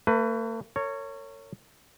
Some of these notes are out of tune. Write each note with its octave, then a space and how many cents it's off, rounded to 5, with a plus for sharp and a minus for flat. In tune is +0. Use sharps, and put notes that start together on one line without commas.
A3 +45 B4 +15
A#4 -40 C#5 +0